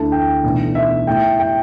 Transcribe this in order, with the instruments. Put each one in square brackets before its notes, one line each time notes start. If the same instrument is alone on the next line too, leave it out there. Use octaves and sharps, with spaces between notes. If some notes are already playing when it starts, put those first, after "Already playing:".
Already playing: [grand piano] D2 D3 A3 E4 A5
G5
B1 A2 E3 A3 D4
E5
A2 A3 E4 G5
G5